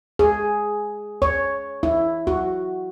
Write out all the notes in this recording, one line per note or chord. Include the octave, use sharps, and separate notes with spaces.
G#4
C#5
E4
F#4